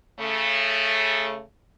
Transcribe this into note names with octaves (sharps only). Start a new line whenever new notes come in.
C#3 A3